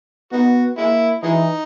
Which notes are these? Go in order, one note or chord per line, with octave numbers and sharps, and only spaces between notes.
B3 D#4 F#4
G#3 A#3 E4
E3 F#3 G#3 D#4